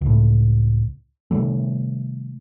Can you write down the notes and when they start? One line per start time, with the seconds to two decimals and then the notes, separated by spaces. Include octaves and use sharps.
0.01 C#2 A2
1.31 C3 D#3 G3 A3